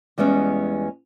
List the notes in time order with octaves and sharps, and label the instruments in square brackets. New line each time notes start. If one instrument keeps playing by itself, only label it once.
[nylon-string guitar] E2 G3 G#3 B3 C#4